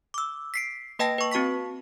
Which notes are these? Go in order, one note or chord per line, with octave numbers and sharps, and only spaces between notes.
D6 E6
B6 C7 D7
A#3 B4 D#5 G5 A5 A#6
B4 C#6
C4 F#4 A5 C#6 B6